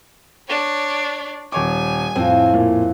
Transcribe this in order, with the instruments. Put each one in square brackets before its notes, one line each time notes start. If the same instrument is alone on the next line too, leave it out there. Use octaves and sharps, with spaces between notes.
[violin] D4 C#5
[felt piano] D#1 C#5 D6 [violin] G#5
[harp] F2 A2 [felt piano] C4
[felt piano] A#2